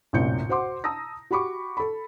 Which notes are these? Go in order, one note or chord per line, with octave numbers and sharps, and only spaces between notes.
A#1 F#2 A2 C3 G6 C#7
F#4 C5 F#5 C6 D6
A5 A#5 D#6 E6 A#6
F#4 G4 B5 C#6 D6
A4 B5